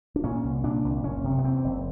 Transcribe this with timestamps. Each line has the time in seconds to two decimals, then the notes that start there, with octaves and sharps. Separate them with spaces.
0.16 D4
0.24 A#2 C#4
0.44 C2
0.64 A#2 D4
0.84 C2
1.04 F#1 C#4
1.24 C3
1.39 B3
1.44 E2 C4
1.64 F#1